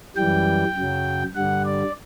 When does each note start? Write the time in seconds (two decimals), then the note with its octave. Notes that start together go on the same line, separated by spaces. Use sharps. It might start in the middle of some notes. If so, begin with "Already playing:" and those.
0.16 F#2 E3 G3 G5
0.76 F#2 C#3 F#3
1.35 G2 D3 G3 F#5
1.65 D5